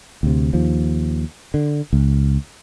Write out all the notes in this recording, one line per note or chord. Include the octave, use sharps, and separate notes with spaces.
D2 C3
D#2 F3
D3
C#2